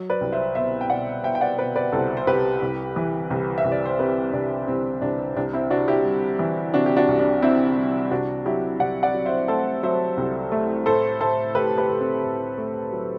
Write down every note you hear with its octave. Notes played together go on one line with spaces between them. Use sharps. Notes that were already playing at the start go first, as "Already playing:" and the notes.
Already playing: F#3
B4 D5
C2
C5 E5
B2 C5 E5
G5
B2 D5 F#5
B2 E5 G5
G5
D5 F#5
B2 B4 D5
B4 D5
C2 A4 C5
C5
C2 G4 B4
C2
E3
C2
E5
C2
D5
C5
C3 G4 B4
C2 D4
C2 C4
C2 D4
C2 D4
C4 E4
C3 D4 F#4
E4 G4
G3
E3
C3 D4 F#4
G4
D4 F#4
C2
D4
C3 C4 E4
G3
C2 D4 F#4
F#3 E4 G4
C2 D5 F#5
D5 F#5
F#3
C5 E5
A3 A4 C5
F#3 C5 E5
C2
A3
A2 A4 C5
A2 A4 C5
A2 G4 B4
G4 B4
A2
C4
A2
A3
F#3